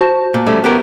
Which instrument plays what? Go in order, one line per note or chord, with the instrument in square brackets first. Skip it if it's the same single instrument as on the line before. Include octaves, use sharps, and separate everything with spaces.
[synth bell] F#4 C5 A5
[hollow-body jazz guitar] A#2
G3 A3 C#4
B3 G4 A#4